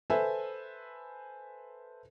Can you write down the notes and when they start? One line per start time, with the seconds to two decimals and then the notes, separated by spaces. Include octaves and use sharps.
0.10 A4 B4 C5 E5 G#5